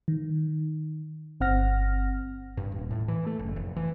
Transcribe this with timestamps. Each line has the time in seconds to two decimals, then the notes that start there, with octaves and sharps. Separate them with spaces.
0.08 D#3
1.40 G1 C4 F#5 F6 A#6
2.57 G2
2.72 D#1
2.91 A2
3.08 E3
3.27 A3
3.39 F#1
3.56 F1
3.76 E3